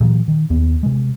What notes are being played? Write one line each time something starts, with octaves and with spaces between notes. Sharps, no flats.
A#2 E3 F#3
D#3
D#2 B3
C3 G#3